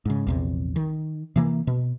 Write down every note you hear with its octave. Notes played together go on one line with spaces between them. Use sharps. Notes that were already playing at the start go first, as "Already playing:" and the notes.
G#2 C#3
A#1 E2 C3
D#3
C3 E3 A#3
B2